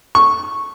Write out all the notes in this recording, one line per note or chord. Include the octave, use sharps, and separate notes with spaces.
C#6